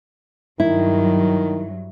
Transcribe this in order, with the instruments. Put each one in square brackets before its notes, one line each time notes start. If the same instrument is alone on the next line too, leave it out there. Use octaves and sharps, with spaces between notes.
[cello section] G2 F#3 [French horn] D#3 [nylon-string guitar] E4